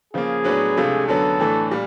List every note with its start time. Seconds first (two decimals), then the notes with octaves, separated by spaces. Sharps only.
0.13 C#3 F3 A#3 G#4
0.44 A2 F#3 B3 D4
0.77 C#2 C3 F3 A3 D4
1.07 F#2 D3 F#3 B3 A4
1.39 A2 E3 A3 D4
1.71 A#2 G3